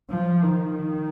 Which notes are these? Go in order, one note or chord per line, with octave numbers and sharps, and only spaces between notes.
F3
D#3